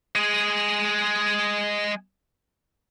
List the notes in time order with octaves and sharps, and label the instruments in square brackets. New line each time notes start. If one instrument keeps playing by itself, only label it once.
[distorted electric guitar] G#3 G#4